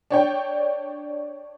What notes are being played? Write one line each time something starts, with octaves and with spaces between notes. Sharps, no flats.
D4 C#5 G5